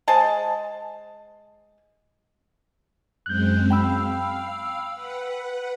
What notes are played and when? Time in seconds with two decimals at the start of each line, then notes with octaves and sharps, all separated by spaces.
0.08 G#3 G#4 C5 A5
3.26 F#2 G#3 C4 F#6 G6
3.70 F5 G5 B5 E6
4.95 B4 F#5